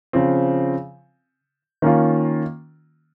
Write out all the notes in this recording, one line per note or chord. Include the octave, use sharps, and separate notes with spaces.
C#3 F3 C4
D#3 A#3 C#4 F4